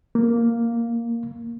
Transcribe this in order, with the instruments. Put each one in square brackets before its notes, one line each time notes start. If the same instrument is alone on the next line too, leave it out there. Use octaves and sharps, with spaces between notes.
[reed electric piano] A#3